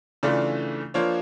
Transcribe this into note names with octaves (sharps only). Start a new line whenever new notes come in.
C#3 E3 A3 D4 F4 D5
F3 A#3 D4 F4 C#5